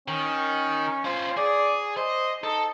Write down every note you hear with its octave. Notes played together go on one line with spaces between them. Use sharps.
D#3 C#4
C#4 F4 C5
G#4 D5
C5 D#5
D#4 A4